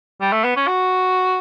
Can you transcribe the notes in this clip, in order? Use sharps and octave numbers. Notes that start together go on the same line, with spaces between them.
G3
A3
B3
C#4
F#4